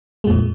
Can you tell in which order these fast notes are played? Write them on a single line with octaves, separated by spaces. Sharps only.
G#3 A#2 F2